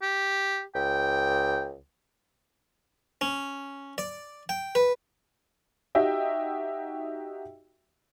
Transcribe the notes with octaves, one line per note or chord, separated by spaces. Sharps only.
G4
C#2 G5
C#4
D5
G5
B4
D#4 F#4 G4 D#5 E5 G5